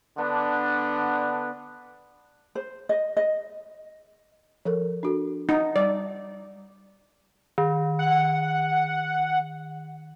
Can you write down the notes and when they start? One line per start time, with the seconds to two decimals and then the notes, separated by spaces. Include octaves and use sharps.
0.18 D3 B3 D4
2.55 C5
2.89 D#5
3.17 D#5
4.65 F3 A4 A#4
5.03 D4 F#4 A4
5.49 D#4 F#5
5.76 G3 D5
7.58 D#3
7.99 F#5